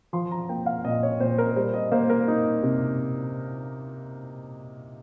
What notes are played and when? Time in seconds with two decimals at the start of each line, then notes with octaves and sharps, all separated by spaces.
0.13 F3 C6
0.32 A#5
0.49 A#3 G5
0.66 F5
0.85 A#2 D#5
1.03 C#5
1.20 A#2 C5
1.38 A#4
1.56 G3 C5
1.74 D#5
1.92 A#3 C5
2.10 A#4
2.28 D#4
2.63 C3